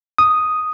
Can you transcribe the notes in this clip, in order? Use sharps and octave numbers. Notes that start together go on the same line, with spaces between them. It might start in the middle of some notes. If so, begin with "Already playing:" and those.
D#6